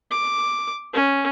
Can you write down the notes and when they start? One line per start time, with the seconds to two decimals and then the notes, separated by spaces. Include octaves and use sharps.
0.11 D6
0.93 C#4